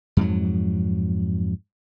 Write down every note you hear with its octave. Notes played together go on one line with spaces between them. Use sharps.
F2 G#2 F#3